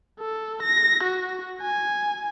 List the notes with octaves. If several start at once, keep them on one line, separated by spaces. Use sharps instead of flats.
A4
A#6
F#4
G#5